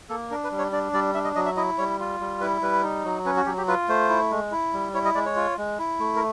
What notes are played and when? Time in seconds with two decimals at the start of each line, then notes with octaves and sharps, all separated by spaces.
0.09 A#3 A4
0.31 D4 A#4
0.44 B4
0.51 G3
0.59 C#5
0.72 D4 D5
0.93 G3 D5
1.14 D4 E5
1.24 D#5
1.36 F#3 D#5
1.46 E5
1.56 E4 D#5
1.78 G3 C#5
1.99 F4
2.20 G3
2.40 E4 B4
2.62 G3 B4
2.83 D#4
3.04 F#3
3.25 C#4 B4
3.37 F#4
3.46 F#3 G4
3.58 G4
3.68 F4 B4
3.89 A3 C5
4.09 E4
4.31 G#3
4.51 E4
4.73 G3
4.94 E4 C#5
5.05 D#5
5.15 G#3 D5
5.26 C#5
5.36 F4
5.58 G#3
5.79 E4
5.99 A3
6.16 A#4